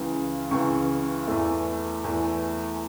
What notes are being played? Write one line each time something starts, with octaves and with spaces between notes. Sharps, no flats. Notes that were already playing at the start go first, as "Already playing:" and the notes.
Already playing: C#2 C#3 E3
C#2 C#3 E3 C#6
E2 E3 A3
E2 E3 A3